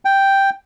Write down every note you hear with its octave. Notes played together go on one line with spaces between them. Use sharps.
G5